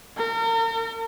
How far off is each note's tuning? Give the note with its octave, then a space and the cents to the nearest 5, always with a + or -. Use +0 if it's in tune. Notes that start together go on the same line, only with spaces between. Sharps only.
A#4 -40